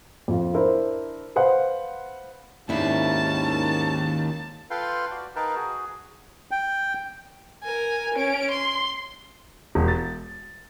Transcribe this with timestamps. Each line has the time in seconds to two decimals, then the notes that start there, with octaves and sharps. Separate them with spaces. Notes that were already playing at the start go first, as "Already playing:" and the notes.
0.28 F2 F4
0.54 D4 E4 A#4 C5
1.36 B4 C5 F5 F#5
2.69 D#2 G#2 D#3 C#4 D4 E4 A5
4.71 F4 A4 B4 F5 G5 C6
5.11 F#4 D5
5.36 D#4 A#4 B4 F5 G5 A5
5.55 F#4 G#4
6.51 G5
7.64 A#4 G#5
8.14 C#4 D7
8.51 C6
9.75 E1
9.88 A6